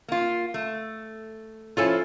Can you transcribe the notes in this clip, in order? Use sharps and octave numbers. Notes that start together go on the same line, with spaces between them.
A#3 F4
A3
F3 C#4 E4 F4 A4 G#5